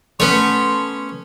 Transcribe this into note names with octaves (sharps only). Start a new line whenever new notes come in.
A3 B3 C#4 B4 C#5 C6